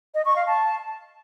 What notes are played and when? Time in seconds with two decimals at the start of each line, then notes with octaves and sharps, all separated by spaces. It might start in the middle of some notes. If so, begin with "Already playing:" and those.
0.14 D#5
0.25 C#6
0.36 F5
0.47 A5